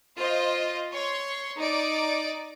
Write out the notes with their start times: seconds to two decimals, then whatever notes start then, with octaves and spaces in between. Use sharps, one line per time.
0.18 F4 C5 D#5
0.92 C#5 C6
1.56 D#4 D5